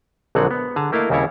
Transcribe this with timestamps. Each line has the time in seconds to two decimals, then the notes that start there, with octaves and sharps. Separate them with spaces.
0.35 A#1 D3 F#3 G#3 C4 F#5
0.51 B3
0.76 D3 G#4 A5 A#5
0.92 A3 A#3 E4 A#4 D#5 F5
1.10 D#2 C#3 G3 C4 E4 C#5